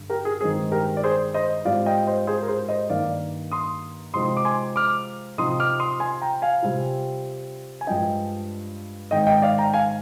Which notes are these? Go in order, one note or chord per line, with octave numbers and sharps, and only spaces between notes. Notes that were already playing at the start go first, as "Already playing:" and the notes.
Already playing: G2 D3
G4 A#4
G#4
G2 D#3 G#3 C4 G#4
G4 A#4
D5
G#4 C5
C5 D#5
G#2 G3 C4 F4 D5 F5
D#5 G5
C5 D#5
G#4 C5
A#4
G#4 C5
C5 D#5
G2 D#3 A#3 D#4 D5 F5
C6 D#6
C3 F3 G#3 C4 D#4 C6 D#6
D6
G#5 C6
D6 F6
C3 F3 C4 D#4 C6 D#6
D6 F6
C6 D#6
G#5 C6
G5 A#5
F5 G#5
C3 G3 C4 F4
G#5
G2 F3 G#3 D4 D#5 G5
G#2 D#3 G#3 C4 D#5 G5
D#5 G5
D5 F5
G5 A#5
F5 G#5